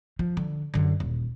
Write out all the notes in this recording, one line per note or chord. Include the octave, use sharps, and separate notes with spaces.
F3
D3
F#2 D3
D#1